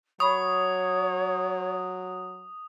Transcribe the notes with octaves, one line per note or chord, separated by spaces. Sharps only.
F#3 C#5 B5 C#6 D#6